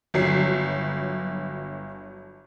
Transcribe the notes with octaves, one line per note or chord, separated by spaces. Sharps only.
G1 F#3 C7